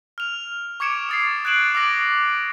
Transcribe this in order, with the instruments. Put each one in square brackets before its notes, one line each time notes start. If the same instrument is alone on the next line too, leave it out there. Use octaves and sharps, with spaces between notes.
[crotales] F6 F7
C#6 D6 G#6 C#7 D7 E7
D#6 A6 C7
F#6 G#6 A6 D7 E7 F#7
D6 E6 A#6 F#7